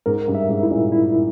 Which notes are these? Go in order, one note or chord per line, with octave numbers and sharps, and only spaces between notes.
G#2 A#4
G2
E5
G#2
E4
G2 A#2
E4